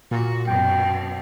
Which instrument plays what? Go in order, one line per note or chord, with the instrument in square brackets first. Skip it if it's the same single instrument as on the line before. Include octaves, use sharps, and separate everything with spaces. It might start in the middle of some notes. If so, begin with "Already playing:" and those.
[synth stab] A#2 [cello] F#4
[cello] F#2 B2 [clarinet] G5